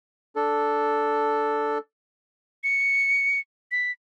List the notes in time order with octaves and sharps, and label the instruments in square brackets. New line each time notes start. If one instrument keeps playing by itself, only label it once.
[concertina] D4 A4
[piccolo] C#7
B6